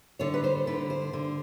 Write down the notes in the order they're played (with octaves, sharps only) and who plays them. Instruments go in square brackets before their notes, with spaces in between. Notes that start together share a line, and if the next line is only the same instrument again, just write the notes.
[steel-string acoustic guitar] D3 C#5
B4
C5
D3 B4
C5
D3